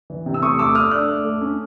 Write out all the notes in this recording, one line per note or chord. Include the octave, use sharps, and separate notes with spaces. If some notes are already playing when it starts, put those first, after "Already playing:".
E3
C3
E6
A3 C#6 D#6
A3 D6 E6
A3 D#6 F6
D4 E6 F#6
A3
A3
C#4